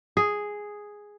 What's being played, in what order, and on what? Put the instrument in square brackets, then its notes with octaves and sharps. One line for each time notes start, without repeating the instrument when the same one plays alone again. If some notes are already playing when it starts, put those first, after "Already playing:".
[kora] G#4